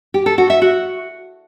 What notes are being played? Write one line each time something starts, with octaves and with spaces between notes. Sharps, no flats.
G4
A4
F#4
E5
F#4